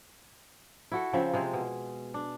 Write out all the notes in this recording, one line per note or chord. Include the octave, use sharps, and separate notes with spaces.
E4 F#4 A4
C#3 F3 C4 E5
C3 G#3 C4 G#4
B2
D4